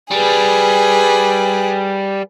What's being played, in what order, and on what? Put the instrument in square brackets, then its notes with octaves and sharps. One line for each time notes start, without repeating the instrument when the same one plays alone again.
[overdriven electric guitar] G3 [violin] G#4 B4